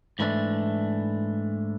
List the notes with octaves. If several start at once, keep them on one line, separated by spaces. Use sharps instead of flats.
G#2 E3 A3 D4